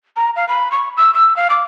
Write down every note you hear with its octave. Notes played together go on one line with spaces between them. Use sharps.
A#5
F5
B5
C#6
E6
E6
F5
D6